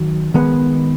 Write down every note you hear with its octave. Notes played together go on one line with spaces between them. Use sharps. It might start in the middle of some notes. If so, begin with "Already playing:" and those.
Already playing: D#3 F#3
D#3 G#3 B3